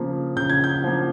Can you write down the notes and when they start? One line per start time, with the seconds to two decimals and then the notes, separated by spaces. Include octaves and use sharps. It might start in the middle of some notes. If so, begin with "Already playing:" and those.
Already playing: C#3 F3 A#3
0.36 C#3 G6
0.50 G#6
0.64 G6
0.84 F3 A#3